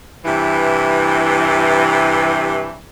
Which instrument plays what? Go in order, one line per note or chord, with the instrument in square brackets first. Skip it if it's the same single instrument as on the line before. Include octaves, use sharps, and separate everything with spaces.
[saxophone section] G2 C3 E3